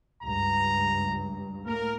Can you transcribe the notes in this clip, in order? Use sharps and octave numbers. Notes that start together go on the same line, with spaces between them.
C#2 G2 A#5
A2 A#3 A#4